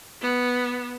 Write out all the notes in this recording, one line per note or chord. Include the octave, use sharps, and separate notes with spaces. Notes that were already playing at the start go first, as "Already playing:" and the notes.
B3